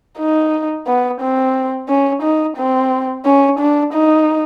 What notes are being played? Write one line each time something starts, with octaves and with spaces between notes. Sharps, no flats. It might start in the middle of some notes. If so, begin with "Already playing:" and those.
D#4
B3
C4
C#4
D#4
C4
C#4
D4
D#4